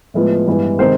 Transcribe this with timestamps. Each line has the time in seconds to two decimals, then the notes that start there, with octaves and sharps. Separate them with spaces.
0.14 A2 F3 G#3 B3
0.46 G2 E3 G#3 B3
0.79 C3 D#3 G#3 C5